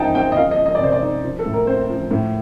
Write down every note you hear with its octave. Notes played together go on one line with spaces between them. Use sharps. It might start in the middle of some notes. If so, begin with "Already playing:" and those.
Already playing: F3 D#4 G5 A5
C4 G5
D#5
F3 F5
D#5
F3
D#5
D5
C3 C5
D5
D#4
F3
A4
A2
A#4
C4 C5
F3
A2